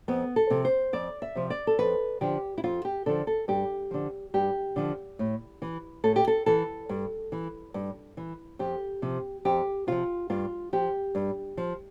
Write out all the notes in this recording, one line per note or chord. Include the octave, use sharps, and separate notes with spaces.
F2 B3
A4
C3 F3
C5
F2 D5
E5
C3 F3
D5
A4
F2 B4
D3 F3 G4
E4
F2 F4
G4
D3 F3 A4
A4
G2 G4
D3 F3
G2 G4
D3 F3
A2
E3
A2 A4
G4
A4
E3 A4
G2
E3
G2
E3
F2 G4
C3 F3
F2 G4
C3 F3 F4
G2 F4
F3 G4
G2
F3